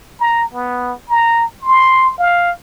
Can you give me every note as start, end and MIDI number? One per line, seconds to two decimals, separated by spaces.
0.20 0.45 82
0.53 0.93 59
1.09 1.45 82
1.62 2.15 84
2.18 2.51 77